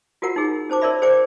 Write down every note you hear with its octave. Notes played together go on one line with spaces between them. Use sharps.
F4 F#4 A#4 F#5 A#5
D#4 G#4
C#4 C5 A5 D6
A#4 C#5 D5 E5 B5
G#4 C5 D5 G5 D6